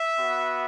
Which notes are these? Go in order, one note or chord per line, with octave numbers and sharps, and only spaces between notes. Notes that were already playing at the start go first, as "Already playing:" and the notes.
Already playing: E5
B3 F#4